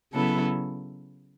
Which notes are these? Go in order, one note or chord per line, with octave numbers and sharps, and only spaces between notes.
C#3 F#3 B3 E4 A4